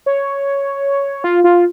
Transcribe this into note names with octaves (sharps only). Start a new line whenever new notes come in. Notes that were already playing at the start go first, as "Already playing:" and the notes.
C#5
F4
F4